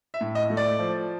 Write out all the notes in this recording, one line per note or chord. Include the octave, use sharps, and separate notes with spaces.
E5
A2
D#5
A3
D5
F3